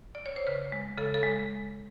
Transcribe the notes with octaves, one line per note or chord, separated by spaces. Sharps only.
D5
C#5
C5
C#3 B4
G#3
C#3 A4
A4
G#3